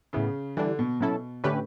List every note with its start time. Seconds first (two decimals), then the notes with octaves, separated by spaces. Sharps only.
0.13 A2 C#3 E3 B3
0.57 D3 E3 G3 D4
0.79 B2
1.00 B2 F#3 C#4 E4 A4
1.44 A2 D3 A3 C#4 G4 B4